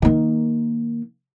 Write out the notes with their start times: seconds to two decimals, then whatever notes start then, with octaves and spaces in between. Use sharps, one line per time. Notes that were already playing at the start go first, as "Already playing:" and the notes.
0.02 D#3 A#3